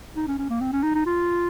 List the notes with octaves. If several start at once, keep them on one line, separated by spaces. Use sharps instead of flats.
D#4
C#4
C#4
A#3
C4
C#4
D#4
D#4
F4